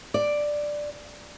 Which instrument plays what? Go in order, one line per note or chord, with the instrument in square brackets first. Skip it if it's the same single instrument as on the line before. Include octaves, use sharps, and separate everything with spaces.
[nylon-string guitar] D5